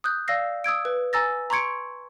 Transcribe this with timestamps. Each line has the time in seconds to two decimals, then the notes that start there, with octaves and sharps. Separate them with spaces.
0.04 D#6 F#6 G6
0.28 D5 F5 E6 A#6 C7
0.64 D#6 E6 G#6 D7
0.85 B4
1.13 G#5 A#5 E6 A6 A#6
1.50 A#5 C6 C#6 G#6 C#7 D7